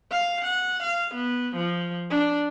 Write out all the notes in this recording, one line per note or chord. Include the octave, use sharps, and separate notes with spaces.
F5
F#5
F5
B3
F3
D4